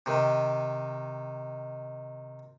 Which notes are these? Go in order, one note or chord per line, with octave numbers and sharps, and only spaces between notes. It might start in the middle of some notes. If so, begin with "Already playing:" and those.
C3 D#3